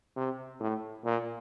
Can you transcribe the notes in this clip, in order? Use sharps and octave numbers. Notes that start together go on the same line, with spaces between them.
C3
A2
A#2